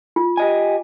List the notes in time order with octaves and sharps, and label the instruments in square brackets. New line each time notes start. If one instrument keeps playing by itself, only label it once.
[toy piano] F4
[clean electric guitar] G4 D#5 G#5